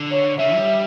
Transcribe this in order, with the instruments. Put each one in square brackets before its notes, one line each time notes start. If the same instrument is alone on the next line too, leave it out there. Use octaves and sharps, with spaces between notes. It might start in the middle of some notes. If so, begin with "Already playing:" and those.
Already playing: [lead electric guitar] D3
[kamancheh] C#5
[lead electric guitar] C#3 [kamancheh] E5
[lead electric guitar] G3